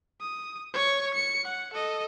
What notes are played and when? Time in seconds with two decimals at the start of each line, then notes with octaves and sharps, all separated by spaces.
0.21 D#6
0.74 C#5 C#6
1.14 C#7
1.44 F#5
1.73 A4 D#5